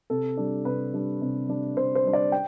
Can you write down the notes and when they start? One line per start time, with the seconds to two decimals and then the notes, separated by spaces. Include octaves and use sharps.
0.10 C3 A4
0.37 G3 D4
0.65 C3 B4
0.93 G3 D4
1.21 C3
1.49 G3 D4
1.77 C3 C5
1.95 C5
2.05 G3 D4
2.13 D5
2.32 G5